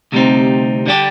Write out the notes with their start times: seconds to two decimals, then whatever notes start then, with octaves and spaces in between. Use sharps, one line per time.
0.12 D2 C3 G3 C4 D#4
0.86 D3 G3 D4 G4